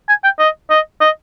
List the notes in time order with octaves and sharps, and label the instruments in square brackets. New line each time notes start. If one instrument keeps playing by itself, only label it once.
[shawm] G#5
G5
D#5
D#5
D#5